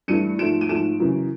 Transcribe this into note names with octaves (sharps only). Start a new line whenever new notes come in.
G2 E3 A3 C#7 D#7
G#2 F3 A3 D7 E7
D#7
G#2 F3 A3 D7 E7
F#2 C#3 E3